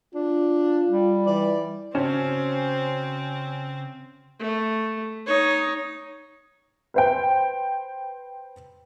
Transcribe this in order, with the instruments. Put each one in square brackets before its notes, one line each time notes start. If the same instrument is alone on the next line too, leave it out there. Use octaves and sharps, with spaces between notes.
[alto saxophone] D4 [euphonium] F4
[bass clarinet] G3
[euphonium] E3 [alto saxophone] D5
[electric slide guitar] C#3 F#4 A5 [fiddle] C4 [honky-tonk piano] C#4 [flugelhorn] C5
[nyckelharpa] A3
D#4 C#5
[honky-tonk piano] B4 C5 G5